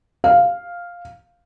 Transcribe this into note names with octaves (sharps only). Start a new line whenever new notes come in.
F5